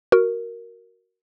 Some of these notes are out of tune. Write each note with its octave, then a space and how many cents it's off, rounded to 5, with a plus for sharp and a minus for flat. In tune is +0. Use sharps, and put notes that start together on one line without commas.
F#4 +0 A#4 +0